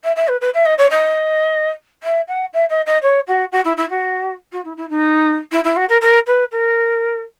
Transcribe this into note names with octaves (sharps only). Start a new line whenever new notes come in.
E5
E5
B4
B4
E5
D#5
C#5
D#5
E5
F#5
E5
D#5
D#5
C#5
F#4
F#4
E4
E4
F#4
F#4
E4
E4
D#4
E4
E4
F#4
A#4
A#4
B4
A#4